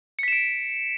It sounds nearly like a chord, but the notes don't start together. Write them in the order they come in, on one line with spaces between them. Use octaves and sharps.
C#7 B6 E7 D7